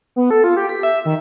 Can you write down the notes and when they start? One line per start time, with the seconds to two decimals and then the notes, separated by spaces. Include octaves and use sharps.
0.16 B3
0.31 A4
0.44 F4
0.57 G4
0.69 B6
0.83 E5
1.05 D#3